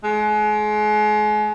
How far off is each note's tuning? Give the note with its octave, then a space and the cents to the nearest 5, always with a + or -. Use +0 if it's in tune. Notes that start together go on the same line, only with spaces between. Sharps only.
G#3 +35